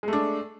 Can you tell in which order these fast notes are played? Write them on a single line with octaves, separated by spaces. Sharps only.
G#3 A3 D4